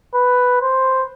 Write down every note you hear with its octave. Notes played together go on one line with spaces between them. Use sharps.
B4
C5